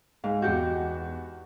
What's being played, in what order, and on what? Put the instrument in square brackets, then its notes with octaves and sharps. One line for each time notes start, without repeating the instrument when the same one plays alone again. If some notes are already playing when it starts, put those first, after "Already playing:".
[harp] G#2 [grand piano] F5
[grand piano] E2 F#4 [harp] G4 F#5 G6